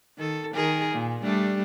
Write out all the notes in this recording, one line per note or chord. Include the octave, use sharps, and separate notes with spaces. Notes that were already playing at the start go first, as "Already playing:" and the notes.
D#3 A4
D#3 G#4 A#4
A#2
G3 A3 D4